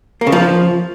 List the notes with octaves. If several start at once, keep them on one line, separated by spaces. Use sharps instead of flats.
A#3
C#3
F3